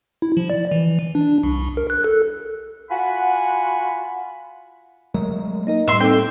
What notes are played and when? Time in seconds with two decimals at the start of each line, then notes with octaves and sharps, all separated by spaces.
0.22 E4
0.37 F3
0.50 D5
0.71 E3
1.15 D4
1.43 C2
1.77 A#4
1.90 F#6
2.04 A4
2.91 F4 F#4 F#5 G#5 B5
5.14 F#3 G#3 A3 A#4
5.67 A#3 D#4 A#4 D#5
5.88 A2 G3 E5 C6
6.00 C4 D#4 A4 G5 D6